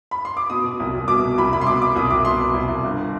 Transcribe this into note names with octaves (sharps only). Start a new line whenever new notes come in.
B5
C6
D6
B2 D#6
B2
C2
C2
B2 D6
B2
C2 B5
C2 B5
C6
B2 D6
B2 D6
C2 D#6
C2 D6
B2 C6
B2
C2
C2
G1